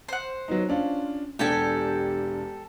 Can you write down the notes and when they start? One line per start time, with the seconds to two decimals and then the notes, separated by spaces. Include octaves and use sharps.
0.09 C5 F#5
0.48 F#3 B3 D#4
0.69 C#4 D4 F4
1.39 E1 D4 G4 A4 G#5